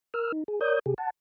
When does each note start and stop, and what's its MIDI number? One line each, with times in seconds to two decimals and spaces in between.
0.14 0.32 70
0.14 0.32 88
0.14 0.32 89
0.32 0.44 63
0.48 0.59 68
0.61 0.79 70
0.61 0.79 73
0.61 0.79 74
0.61 0.79 87
0.61 0.79 91
0.86 0.94 48
0.86 0.94 67
0.86 0.94 68
0.98 1.10 78
0.98 1.10 81